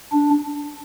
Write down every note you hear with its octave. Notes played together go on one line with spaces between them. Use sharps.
D4